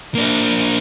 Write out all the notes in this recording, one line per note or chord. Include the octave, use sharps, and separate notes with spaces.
A#3 D4